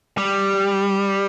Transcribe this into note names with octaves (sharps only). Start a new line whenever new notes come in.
G3